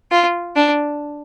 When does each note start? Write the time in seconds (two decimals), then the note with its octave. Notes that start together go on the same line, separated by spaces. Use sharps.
0.11 F4
0.56 D4